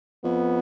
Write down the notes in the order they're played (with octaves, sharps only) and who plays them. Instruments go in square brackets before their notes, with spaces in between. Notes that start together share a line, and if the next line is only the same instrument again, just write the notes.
[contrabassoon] F2 [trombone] B3